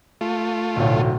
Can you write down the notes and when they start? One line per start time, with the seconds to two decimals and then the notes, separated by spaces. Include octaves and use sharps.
0.21 A3 F4
0.76 D1 B1